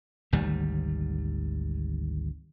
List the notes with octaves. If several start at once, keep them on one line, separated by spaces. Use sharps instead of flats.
G#1 D2 D#3 G3